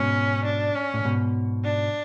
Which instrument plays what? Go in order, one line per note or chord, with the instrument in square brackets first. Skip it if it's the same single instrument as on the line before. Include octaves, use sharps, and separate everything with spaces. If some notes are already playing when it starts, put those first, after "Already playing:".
Already playing: [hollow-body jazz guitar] G#2 B2 [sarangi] C#4
[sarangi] D4
C#4
[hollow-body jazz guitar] A2
G#2 B2
[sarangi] D4